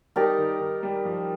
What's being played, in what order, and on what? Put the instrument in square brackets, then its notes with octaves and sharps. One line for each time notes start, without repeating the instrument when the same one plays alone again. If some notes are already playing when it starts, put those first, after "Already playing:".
[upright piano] G3 [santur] D#4 G4 A#4 D5
[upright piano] D#3
D#3
G3
F3